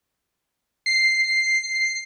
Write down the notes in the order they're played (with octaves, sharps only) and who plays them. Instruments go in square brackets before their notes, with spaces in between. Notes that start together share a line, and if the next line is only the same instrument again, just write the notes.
[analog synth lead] C7